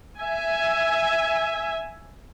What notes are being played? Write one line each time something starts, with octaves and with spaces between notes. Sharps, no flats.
E5 G#5